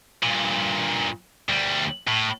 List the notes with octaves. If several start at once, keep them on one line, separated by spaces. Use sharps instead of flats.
G2 A#2
D2 G3
A2